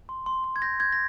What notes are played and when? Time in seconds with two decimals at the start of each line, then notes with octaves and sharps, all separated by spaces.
0.09 C6
0.26 C6
0.44 C6
0.56 G#6
0.62 G6 A#6
0.80 G6 G#6
0.92 A#6